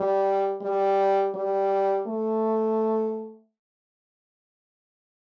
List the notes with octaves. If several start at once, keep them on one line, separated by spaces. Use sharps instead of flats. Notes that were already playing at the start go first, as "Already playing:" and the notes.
Already playing: G3
G3
G3
A3